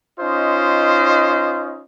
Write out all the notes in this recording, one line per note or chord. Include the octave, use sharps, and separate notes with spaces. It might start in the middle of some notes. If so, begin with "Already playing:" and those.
C#4 D#4 F4 C5 D#5